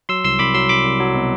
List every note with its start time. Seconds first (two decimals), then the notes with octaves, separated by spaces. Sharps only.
0.09 F#3 C6 E6
0.24 C2 C6 E6
0.39 C2 B5 D6
0.54 F#3 C6 E6
0.69 C2 B5 D6
0.85 C2
1.00 F#3
1.15 B2